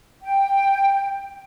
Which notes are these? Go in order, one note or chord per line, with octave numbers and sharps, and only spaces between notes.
G5